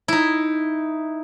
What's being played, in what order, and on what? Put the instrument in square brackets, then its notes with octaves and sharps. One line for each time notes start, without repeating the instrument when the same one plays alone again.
[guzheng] D#4 E4